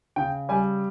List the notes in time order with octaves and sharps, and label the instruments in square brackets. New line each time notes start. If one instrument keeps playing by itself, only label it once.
[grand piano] C#3 G5
G3 G#5